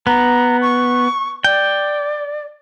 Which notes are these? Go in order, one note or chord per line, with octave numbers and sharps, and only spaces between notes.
B3 A#5
C#6
D5 G5